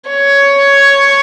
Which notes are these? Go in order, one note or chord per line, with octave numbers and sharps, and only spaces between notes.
C#5